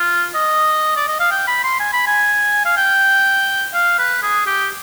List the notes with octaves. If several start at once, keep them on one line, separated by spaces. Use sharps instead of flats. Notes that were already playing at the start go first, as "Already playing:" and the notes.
Already playing: F4
D#5
D5
D#5
F5
G5
B5
C6
G#5
B5
G#5
F5
G5
F5
B4
G#4
G4